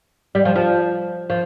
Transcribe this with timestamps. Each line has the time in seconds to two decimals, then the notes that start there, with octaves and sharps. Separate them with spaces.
0.35 G3
0.45 F3
0.55 F3
1.30 F3